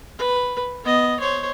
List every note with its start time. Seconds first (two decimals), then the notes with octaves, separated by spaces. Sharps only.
0.18 B4
0.84 B3 D#5
1.20 C5 C#5